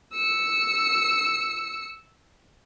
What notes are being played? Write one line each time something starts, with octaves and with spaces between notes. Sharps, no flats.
E6 C#7